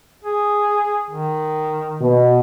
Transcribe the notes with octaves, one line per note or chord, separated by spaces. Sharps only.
G#4
D#3
B2